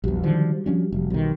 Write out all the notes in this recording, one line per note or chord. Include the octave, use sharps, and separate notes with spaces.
A#1 E2 F#3 G3
D3 D#3 F3
F3 C#4 D4
F1
B1 D#3